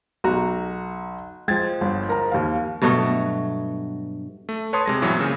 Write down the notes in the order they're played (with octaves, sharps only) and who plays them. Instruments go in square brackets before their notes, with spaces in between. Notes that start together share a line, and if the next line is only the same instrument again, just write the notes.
[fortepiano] B1 F#4 A#5
[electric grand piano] F3 G#3 [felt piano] G5 G#6 A6
[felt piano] G1
A#4 A#5
D#2 F5
[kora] G2 B2 F#3 A3
[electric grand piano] A3
B4 C#5 A5 C6 D#6
C3 G#3 A#6
G2 B2 E3 F#3 B3 C4
A#2 C#3